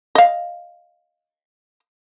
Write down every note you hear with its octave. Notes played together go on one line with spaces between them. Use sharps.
D#5 F5